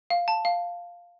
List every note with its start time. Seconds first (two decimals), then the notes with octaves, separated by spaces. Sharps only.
0.10 F5
0.28 A5
0.45 F5